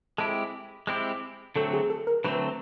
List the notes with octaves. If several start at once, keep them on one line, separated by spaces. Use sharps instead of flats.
G#3 C4 E4 G4 A4
G#3 C4 E4 G4
D3 F#3 A3 C4 A4
G#4
A4
A#4
D3 F#3 A3 C4 B4